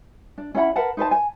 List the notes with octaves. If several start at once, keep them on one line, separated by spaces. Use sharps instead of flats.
D4
C#4 E4 F#5 B5
A#4 B4 F#5 A5
D#4 B4 C5 A5
G#5